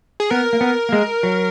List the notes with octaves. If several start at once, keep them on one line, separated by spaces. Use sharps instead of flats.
G#4
B3 A#4
A#3
B3
A#3
G#3
F#3